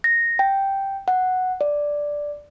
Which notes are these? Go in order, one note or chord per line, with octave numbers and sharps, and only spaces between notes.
A#6
G5
F#5
D5